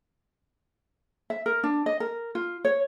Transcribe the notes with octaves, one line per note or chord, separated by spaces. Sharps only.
E5
A#4
D4
D#5
A#4
F4
C#5